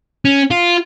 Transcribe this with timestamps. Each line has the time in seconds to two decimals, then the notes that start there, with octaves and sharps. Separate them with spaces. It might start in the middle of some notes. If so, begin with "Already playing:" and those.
0.25 C#4
0.51 F4